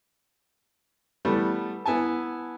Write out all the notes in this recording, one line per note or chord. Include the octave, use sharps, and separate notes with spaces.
E3 G3 A3 B3
B3 E4 G#5 A5